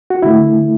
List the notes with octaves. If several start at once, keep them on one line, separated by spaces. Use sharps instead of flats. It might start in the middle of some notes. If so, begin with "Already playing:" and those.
F#4
D3 A3 E4